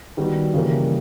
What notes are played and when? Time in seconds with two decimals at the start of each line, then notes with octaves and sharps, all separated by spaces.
0.17 D#3 G3 B3 D#4 F#4
0.54 C#3 E3 G3 A#3 C#4